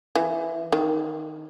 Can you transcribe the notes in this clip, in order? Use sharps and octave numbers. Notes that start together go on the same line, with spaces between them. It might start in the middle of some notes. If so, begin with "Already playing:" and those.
E3
D#3